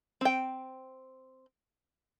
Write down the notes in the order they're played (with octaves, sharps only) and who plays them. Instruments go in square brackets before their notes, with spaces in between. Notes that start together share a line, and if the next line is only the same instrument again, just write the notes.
[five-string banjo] C4 G5